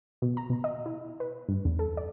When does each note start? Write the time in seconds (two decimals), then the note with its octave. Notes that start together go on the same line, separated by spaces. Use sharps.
0.22 B2
0.37 A#5
0.50 B2
0.64 D#5
0.86 E4
1.20 B4
1.49 G2
1.65 E2
1.79 A4
1.97 D5